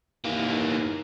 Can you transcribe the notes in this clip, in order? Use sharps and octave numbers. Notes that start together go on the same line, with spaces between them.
D#2 E3 A#3